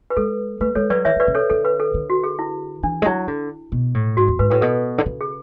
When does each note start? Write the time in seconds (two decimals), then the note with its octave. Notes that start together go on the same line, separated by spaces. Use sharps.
0.10 B4
0.17 G#3 A4
0.60 A3 B4
0.75 G#3 A4 C#5
0.90 F#3 B4 D5
1.05 E3 C#5 E5
1.16 E3 B4 D5
1.27 C#3
1.35 A4 C#5
1.50 D3 A4
1.65 B4
1.80 A4
1.94 D3
2.10 F#4
2.24 G#4
2.39 E4
2.83 E3 D4
3.02 G#3
3.06 F#3 E4
3.28 D3
3.72 B2
3.94 A2
4.17 G#2 F#4
4.28 E2
4.39 G#2 B4
4.50 A2 B4
4.61 B2 A4
4.98 D3
5.06 C#3
5.21 G#4